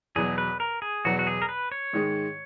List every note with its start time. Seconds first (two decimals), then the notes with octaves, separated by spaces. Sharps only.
0.15 E2 B2 F#3 G#4
0.38 B4
0.60 A#4
0.82 G#4
1.05 E2 B2 F#3 F#4
1.19 F#4
1.27 G#4
1.42 A#4
1.49 B4
1.72 C#5
1.93 G#2 D#3 G#3